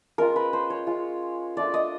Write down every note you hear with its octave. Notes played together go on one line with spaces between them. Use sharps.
G#3 C#4 F4 A#4
B4
C5
C#5
G#3 C#4 F4
A3 D4 F4 D5
D#5